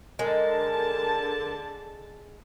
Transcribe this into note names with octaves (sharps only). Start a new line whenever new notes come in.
D3 G#3 A#4 A5